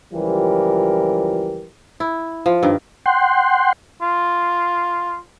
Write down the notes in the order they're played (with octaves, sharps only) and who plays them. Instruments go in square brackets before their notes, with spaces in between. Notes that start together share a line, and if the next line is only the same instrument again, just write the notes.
[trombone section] C#2 E3 F3 G3 G4 A#4
[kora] E4
F3
G2 D#3
[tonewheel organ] F#5 G5 C6
[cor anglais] F4